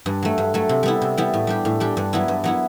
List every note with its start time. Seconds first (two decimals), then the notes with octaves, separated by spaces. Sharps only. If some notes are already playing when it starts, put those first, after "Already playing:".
0.06 G2
0.23 F#3 A3
0.38 G2
0.54 F#3 A3
0.69 C3
0.83 G3 B3 E4
1.02 C3
1.17 G3 B3 E4
1.34 A2
1.47 G3 D4 G4
1.65 A2
1.80 G3 D4 G4
1.97 G2
2.13 F#3 B3 E4
2.28 G2
2.44 F#3 B3 E4